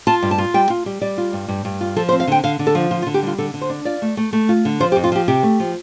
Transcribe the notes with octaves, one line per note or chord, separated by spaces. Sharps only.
F4 A5
G2
A5
F4
G3 G5
F4
G3
G3 D5
F4
G2
G2
G2
F4
F3 A4
C5
C4
F5
D3 G5
D3 F5
D3
A4
F3
D3 F4
F4
D3
G4
G3 F4
D3 A4
D3
C5
D4
F4 D5
A3
A3
A3
F4
D3
F3 C5
G4
F2
F4
F3 G4
C3 G4
A3
F3